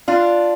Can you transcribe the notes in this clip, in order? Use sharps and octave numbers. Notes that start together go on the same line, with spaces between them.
D4 F4